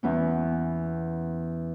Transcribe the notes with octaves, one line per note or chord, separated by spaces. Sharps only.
E2 B3 C#4